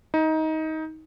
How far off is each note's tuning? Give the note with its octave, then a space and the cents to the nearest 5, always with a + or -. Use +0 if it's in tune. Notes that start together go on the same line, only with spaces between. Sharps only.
D#4 +20